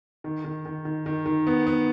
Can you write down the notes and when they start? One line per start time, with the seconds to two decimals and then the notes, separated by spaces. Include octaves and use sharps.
0.24 D#3
0.44 D#3
0.66 D#3
0.85 D#3
1.06 D#3
1.26 D#3
1.47 B3
1.67 B3